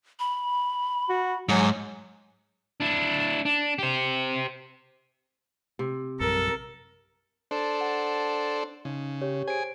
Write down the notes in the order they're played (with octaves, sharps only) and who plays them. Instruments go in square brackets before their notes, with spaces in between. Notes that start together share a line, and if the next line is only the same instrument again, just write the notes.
[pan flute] B5
[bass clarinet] F#4
[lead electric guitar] G#2 [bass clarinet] F#3 [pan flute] G#5
[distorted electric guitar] D4 E4
D4
G4 C5
[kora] C3
[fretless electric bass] A#1 F#2 G3 [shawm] A4 [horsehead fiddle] A#4
[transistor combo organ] D4 A4 C5
[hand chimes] F#5
[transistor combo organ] C#3 [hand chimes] D#4
[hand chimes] G4 C#5
[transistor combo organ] G#4 G#5 [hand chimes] C5 D7